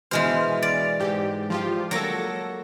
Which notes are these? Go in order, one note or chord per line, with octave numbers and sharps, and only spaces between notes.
B2 E3 G#3 C5 F6
D5
G#2 G4
F3 F4 G4
F#3 A#3 A4 A#6